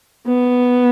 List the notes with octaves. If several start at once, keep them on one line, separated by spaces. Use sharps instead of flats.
B3